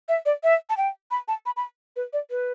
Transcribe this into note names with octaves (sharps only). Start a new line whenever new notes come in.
E5
D5
E5
A5
G5
B5
A5
B5
B5
B4
D5
B4